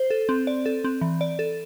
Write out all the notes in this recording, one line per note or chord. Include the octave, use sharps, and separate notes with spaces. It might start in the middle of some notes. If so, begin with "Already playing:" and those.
Already playing: C5
A4
C4
D5
A4
C4
E3
D5
A4